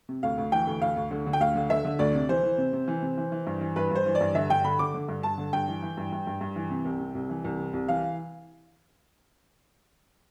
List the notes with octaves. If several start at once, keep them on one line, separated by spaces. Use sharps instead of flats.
C3
D2 F5
D2
E3 G5
D2
D2 F5
D2
D3
D3
G5
D2 F5
D3
D3 E5
D3
D2 D5
C3
E3 C5
E3
C3
C3
E3
C3
E3
E3
G2
E3
G2 B4
G2 C5
E3
D5
G2
D3 E5
G2 G5
D3 B5
D3 D6
D3
G2
G2 A5
D3
G2 G5
E3
E3
G2
G2
G2
G2
E3
C3
C2
C3
C2
E3
C2
C3
C2
E3 F5